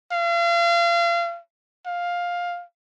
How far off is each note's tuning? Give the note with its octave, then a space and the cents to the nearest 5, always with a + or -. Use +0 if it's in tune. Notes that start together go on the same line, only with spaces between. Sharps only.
F5 -35
F5 +10